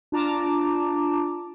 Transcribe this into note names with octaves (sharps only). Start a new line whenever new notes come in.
D4 F4 A5 A#5 D6